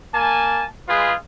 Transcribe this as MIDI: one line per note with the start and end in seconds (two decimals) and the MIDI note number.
0.15 0.64 58
0.15 0.64 80
0.15 0.64 81
0.89 1.14 56
0.89 1.14 65
0.89 1.14 68
0.89 1.14 71